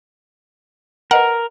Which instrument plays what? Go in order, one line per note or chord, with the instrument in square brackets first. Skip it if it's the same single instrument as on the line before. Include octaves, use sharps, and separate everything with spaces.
[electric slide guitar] A#4 [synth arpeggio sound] B4 D#5 F#5